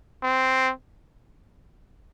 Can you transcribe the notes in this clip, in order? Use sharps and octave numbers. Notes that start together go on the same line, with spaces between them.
C4